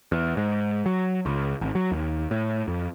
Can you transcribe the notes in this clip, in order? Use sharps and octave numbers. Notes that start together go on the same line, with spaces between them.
E2
G#2
F#3
C#2
G#1
F#3
D#2
A2
F2